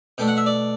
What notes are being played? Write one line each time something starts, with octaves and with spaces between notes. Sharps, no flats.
B2 A3 D4 G5
F#5
E5
D5